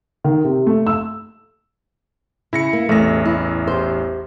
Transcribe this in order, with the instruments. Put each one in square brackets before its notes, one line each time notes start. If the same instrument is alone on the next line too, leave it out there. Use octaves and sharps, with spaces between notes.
[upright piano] D#3
C3
A3
E6
[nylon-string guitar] C#3 [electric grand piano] E4 A#6 C#7
[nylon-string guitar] A#3
[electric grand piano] A1 E2 A#6 [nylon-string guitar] C3 A3
[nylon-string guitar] E4
G4 C5